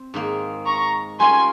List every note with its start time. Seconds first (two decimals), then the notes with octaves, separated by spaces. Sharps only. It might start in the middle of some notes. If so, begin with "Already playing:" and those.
Already playing: C4
0.14 G#2 D#3 A#3
0.66 A#5 C#6
1.19 G3 C#4 F4 A#4 G#5 C6